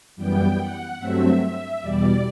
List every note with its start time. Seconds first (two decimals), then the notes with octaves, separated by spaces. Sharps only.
0.16 F#2 E3 G3 B3 G5
0.58 F#5
0.99 G2 F#3 A3 C4 E5
1.40 E5
1.81 E2 B2 G3 D5